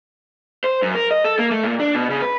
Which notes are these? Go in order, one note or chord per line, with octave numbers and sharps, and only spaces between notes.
C5
F#2
A#4
D#5
A4
A#3
A3
A#2
D4
B2
C#3
B4